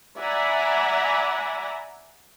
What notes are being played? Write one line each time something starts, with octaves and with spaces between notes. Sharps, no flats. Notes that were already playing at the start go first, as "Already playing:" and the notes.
D5 E5 F#5 G#5 A#5 B5